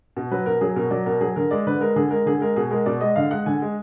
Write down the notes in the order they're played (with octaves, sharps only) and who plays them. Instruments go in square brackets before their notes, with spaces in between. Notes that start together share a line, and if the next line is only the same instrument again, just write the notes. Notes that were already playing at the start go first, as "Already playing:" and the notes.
[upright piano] B2
F#3 B4
B2 A#4
F#3 G#4
B2 A#4
F#3 D5
B2 A#4
F#3 G#4
D3 A#4
G#3 D5
D3 B4
G#3 A#4
D3 G#4
G#3 A#4
D3 G#4
G#3 A#4
B2 G#4
G#3 A#4
B2 D5
G#3 D#5
D3 F5
G#3 F#5
D3 G#5
G#3